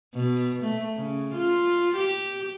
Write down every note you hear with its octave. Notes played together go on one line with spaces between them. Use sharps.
B2
A3
C#3
F4
G4